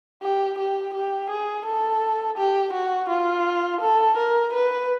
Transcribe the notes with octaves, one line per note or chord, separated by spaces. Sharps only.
G4
G4
G4
G#4
A4
G4
F#4
F4
A4
A#4
B4